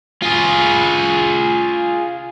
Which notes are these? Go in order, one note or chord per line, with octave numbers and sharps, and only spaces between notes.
F4 G#4